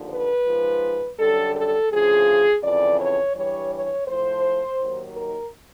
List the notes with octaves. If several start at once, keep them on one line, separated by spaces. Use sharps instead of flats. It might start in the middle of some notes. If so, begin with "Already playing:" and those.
Already playing: D#2 D3 F3
B4
G#2 F3
F#2 D3 G3 A4
A4
D2 C#3 F3 G#4
F2 C#3 E3 D5
C#5
G2 E3 G3 C#5
C#5
A2 F3 C5
D#2 D#3 F#3
A#4